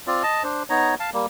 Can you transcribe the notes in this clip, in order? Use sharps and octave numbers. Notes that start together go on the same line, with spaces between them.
C4 F4 D5
D#5 A5
D4 C5
B3 D#4 C#5 A#5
F5 A5
G3 A#3